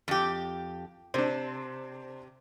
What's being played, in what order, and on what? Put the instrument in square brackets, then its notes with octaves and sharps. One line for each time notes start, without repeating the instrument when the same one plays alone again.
[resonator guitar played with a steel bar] F2 G4
[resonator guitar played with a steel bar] C3 [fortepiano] C4 D4